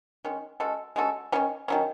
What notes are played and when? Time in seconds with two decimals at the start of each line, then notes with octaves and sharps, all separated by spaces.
0.25 D#3 G#3 C#4
0.60 G#3 C#4 F#4 A4
0.96 G#3 C#4 F#4 A4
1.32 F#3 C#4
1.36 D#3
1.68 D#3 F#3 C#4